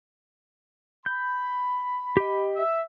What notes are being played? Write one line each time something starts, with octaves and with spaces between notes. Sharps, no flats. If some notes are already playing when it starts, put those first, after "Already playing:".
B5 G6
G4 D#5
E5